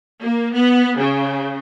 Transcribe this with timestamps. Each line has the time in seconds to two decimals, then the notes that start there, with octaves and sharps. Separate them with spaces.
0.22 A#3
0.53 B3
0.98 C#3